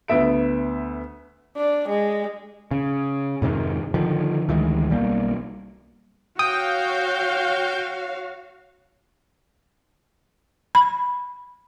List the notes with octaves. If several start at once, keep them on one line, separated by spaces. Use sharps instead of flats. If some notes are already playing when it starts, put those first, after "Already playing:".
D2 B3 E5 D7
D4
G#3
C#3
F2 G#2 C3 D#3
D3 D#3 F3
D2 D#3 E3 G#3
B1 G3 A#3
F#4 C#5 F5 G5 D#6
B5